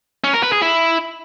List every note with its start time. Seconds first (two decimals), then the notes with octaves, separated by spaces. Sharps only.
0.24 C#4
0.33 A#4
0.43 B4
0.52 G#4
0.62 E4